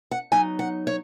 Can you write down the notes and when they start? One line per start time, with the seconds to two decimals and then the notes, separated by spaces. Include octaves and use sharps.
0.11 F#5
0.32 F#3 B3 D#4 G#5
0.59 F#5
0.87 C#5